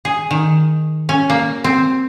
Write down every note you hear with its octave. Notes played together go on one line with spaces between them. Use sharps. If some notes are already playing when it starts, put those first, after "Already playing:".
G#4
D#3
C#4
A#3
C4